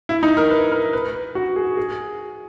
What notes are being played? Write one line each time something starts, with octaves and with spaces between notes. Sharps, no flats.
E4
D#4
A#4
B4
A#4
B4
F#4
G#4
G#4